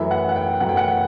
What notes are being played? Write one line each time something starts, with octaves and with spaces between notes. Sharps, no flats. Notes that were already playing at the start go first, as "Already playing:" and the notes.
Already playing: F#2 E3 A3 E5
F#5
F#5
G5
F#2 E3 A3 F#5
G5
F#5